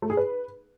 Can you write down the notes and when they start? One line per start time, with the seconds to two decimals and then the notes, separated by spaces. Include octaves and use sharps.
0.02 A3
0.10 G#4
0.17 B4